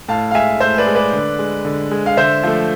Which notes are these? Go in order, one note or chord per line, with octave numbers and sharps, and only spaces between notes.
A2 F5 A5
F5
G#3 E5 G#5
A2 C5 E5
B4 D5
G#3
B4 D5
D3
G#3
D3
G#3
F5
D3 C5 E5
F3 A3